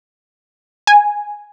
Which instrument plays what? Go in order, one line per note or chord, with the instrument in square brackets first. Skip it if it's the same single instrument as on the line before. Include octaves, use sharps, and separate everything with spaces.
[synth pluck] G#5